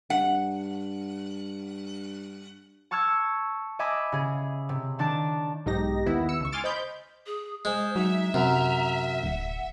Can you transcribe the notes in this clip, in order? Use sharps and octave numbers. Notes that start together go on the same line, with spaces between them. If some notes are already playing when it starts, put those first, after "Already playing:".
G2 F#5
A5 C#6 E6 F6 G#6
D#5 E5 G#5 B5 D6 D#6
C#3 G#4
C3
D#3 D4 A5 A6 D7
B1 G#2 D#4 G4 A#6
D#2 B3 E4
E6 C#7
C#2 C#6
G#5 C6 D6 F6 A6 D7
C5 D#5 B5 G6
G#4
G#3 C5
F#3 D#4 E5
F#2 C3 A#5
D1 F#5